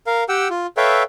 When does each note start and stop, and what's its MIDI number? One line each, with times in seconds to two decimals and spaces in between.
0.07 0.24 70
0.07 0.24 77
0.29 0.48 67
0.29 0.48 78
0.29 0.48 79
0.29 0.48 88
0.50 0.67 65
0.77 1.03 69
0.77 1.03 71
0.77 1.03 73
0.77 1.03 76
0.77 1.03 77
0.77 1.03 79